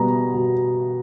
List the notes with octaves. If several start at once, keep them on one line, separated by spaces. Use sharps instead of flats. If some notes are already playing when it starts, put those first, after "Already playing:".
Already playing: B2 G3 B3 A#5
B2